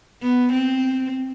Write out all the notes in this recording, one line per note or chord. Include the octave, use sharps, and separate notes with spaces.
B3
C4